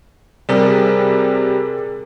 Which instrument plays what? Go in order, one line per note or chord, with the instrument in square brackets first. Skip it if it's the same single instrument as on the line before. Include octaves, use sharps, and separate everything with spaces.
[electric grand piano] C3 G3 [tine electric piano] G#4 A#4